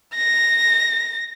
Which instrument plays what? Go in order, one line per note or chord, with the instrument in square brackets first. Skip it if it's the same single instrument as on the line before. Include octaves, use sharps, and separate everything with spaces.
[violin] A#6